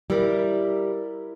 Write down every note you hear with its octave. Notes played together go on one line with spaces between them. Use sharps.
G3 E4 A#4 D5